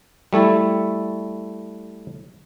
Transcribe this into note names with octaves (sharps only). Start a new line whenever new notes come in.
G3 A3 E4 A4